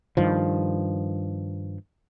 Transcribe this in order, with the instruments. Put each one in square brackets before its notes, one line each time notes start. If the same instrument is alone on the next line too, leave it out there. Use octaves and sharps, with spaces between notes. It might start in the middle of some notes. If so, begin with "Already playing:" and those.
[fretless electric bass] G2 D#3 F3